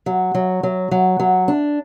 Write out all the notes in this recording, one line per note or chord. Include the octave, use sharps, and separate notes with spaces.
F#3
F#3
F#3
F#3
F#3
D4